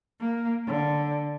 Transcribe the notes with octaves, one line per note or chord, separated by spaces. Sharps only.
A#3
D3